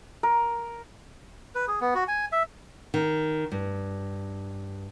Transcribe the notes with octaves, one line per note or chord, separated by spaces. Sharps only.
A#4
B4
G#4
B3
F#4
G#5
E5
D#3
G2